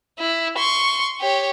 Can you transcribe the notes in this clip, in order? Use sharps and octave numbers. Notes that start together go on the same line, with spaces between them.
E4
C6 C#6
G4 C#5